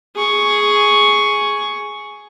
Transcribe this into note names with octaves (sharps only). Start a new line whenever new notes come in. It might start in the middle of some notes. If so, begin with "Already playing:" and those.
G#4 C#6